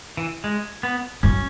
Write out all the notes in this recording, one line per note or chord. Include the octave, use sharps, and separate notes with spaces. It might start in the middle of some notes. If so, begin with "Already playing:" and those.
E3
G#3
B3
F#2 C#4